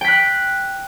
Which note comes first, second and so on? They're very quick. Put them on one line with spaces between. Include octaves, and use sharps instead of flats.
G5 B6 F#6